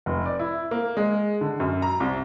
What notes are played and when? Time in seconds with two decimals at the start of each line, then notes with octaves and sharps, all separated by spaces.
0.06 F1
0.26 D5
0.39 E4
0.71 A#3
0.97 G#3
1.41 D3
1.60 F#2
1.82 A#5
2.00 C2